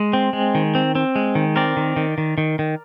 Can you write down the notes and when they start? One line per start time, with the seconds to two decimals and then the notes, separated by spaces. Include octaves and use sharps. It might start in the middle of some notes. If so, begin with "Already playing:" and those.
Already playing: G#3
0.13 C4
0.33 G#3
0.55 D#3
0.75 C4
0.95 C4
1.16 G#3
1.35 D#3
1.56 C4 A#4 D5
1.77 D#3
1.96 D#3
2.18 D#3
2.38 D#3
2.59 D#3